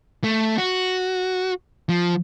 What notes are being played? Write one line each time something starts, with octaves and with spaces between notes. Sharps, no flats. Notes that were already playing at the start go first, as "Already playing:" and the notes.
A3
F#4
F3